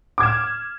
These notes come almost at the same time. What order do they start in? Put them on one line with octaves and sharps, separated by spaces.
D6 G#6 E7 F6